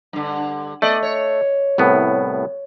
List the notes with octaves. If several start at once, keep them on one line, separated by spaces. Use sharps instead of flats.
G2 D3
A3 B3 D5 D#5
C#5
C2 A2 B3